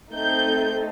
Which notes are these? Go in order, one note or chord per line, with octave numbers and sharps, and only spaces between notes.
A3 C4 D#4 A4 G6